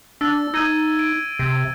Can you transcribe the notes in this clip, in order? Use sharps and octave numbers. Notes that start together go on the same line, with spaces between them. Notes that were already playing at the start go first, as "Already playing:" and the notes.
D4 E6 A6
D#4 E6 G#6 D#7
D7
C3